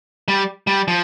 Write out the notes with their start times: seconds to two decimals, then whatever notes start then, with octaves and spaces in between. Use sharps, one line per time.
0.28 G3
0.67 G3
0.88 F3